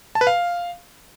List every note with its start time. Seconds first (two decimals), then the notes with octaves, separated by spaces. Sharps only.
0.15 A5
0.21 B4
0.27 F5